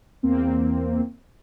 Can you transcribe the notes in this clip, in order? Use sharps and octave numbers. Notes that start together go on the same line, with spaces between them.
E2 A#3 C4